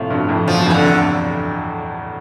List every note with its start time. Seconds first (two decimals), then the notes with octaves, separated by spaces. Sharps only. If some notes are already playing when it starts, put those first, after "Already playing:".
Already playing: A2 C3 F3
0.10 G2 B2
0.28 F2 A2
0.47 E2 G2 F3
0.60 G2
0.65 F2
0.71 E3
0.74 D3
0.83 E2 G2